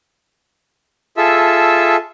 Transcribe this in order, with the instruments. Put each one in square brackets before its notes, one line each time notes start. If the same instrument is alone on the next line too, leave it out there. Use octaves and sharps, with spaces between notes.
[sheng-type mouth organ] F4 G#4 A4 E5 A5 E6